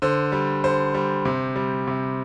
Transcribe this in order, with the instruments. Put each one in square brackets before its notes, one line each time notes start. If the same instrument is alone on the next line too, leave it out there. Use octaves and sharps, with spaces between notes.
[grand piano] D3 C5
G3
D3 C5
G3
C3
G3
C3